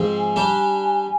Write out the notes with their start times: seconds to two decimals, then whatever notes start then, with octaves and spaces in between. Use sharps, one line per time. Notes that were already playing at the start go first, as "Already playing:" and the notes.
Already playing: G#2 F3 C4 G#4
0.18 G#5
0.36 G3 D4 G4